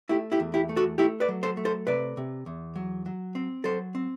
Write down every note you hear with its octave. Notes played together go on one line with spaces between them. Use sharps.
A3 E4 G4
E4 G4
E2
E4 G4
A3
F#4 A4
A3 E4 G4
B4 D5
F#3
A4 C5
A3
A4 C5
C3 B4 D5
C3
E2
F#3
F#3
C4
F#3 A4 C5
C4